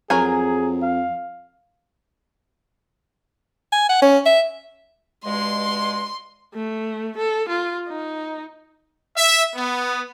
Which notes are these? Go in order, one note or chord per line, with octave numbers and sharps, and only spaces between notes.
F2 F#3 G#4 A#4 G#5
F5
G#5
F#5
C#4
E5
G2 B2 G#3 C6
A3
A4
F4
D#4
E5
B3